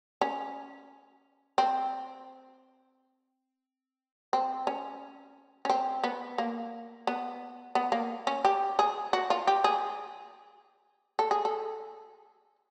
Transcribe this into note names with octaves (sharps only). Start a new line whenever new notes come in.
C#4
C4
C4
C#4
C#4
C4
B3
A#3
B3
B3
A#3
C#4
G4
G#4
F#4
F4
G4
G#4
A4
G#4
A4